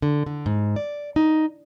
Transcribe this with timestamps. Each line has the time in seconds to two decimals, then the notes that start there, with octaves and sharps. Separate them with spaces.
0.02 D3
0.26 D3
0.46 G#2
0.76 D5
1.16 D#4